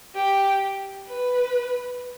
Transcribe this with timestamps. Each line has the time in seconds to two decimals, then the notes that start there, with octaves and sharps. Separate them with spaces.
0.16 G4
1.07 B4